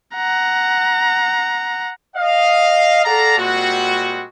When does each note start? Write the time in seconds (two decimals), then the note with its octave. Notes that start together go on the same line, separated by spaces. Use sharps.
0.15 F#5 A#5
2.16 D#5 F5
3.05 A4 D5 F5 F#5 A5 A#5
3.38 A#2 G3 G#3 C4 F#4